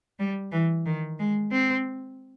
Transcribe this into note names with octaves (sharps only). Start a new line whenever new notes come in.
G3
E3
D#3
G#3
C4